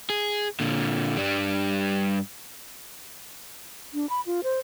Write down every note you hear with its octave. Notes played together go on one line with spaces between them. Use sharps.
G#4
A#2 D3
G2 G3
D4
B5
F4
C5